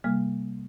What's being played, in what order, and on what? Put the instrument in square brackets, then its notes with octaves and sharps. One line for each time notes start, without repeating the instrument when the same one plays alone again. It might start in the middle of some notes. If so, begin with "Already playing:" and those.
[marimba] C3 G3 A#3 F6